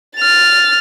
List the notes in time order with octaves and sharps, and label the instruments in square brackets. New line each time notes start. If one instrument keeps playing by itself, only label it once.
[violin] F6 A6